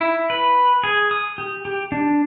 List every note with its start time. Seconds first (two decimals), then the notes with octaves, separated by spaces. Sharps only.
0.01 E4
0.30 B4
0.84 G#4
1.11 D#6
1.38 G4
1.65 G4
1.92 D4